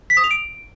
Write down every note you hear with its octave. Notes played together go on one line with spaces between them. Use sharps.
B6
D#6
F7
D7